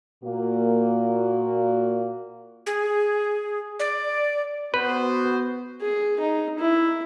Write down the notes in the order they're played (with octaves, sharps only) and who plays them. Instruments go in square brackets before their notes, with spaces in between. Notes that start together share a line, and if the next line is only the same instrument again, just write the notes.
[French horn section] A#2 A#3 F#4
[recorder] G#4
D5
[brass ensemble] B3 F#4 C5 [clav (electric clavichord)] B4
[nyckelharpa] G#4
D#4
E4